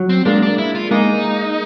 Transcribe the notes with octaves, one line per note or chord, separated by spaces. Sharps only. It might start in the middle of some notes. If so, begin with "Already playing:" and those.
Already playing: F#3
C4
G#3 A#3 D4
D4
E4
F4
G#3 A#3 D#4